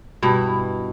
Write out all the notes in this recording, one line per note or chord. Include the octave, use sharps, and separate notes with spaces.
G2 B2 E4